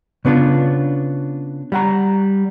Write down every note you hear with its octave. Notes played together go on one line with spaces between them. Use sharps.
C#3 B3 D4 F4
G3 F#5 A#5